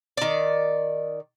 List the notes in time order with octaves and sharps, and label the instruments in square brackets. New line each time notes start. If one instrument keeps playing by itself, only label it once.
[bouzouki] D#3 D5